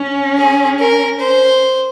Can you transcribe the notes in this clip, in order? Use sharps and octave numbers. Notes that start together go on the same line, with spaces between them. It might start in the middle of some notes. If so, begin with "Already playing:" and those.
Already playing: C#4
G#4
A#4
C5